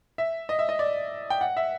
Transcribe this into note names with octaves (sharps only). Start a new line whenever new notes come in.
E5
D#5
E5
D#5
D5
G5
F#5
E5